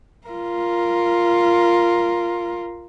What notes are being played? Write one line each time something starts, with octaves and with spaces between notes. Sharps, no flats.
F4 A#4